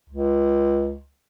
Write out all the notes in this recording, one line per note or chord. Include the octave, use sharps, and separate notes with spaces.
C#2